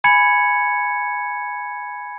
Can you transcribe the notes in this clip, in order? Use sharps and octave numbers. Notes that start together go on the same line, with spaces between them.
G#5 B5 G#6 C#7